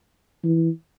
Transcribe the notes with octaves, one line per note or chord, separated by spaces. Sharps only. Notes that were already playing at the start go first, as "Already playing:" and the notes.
E3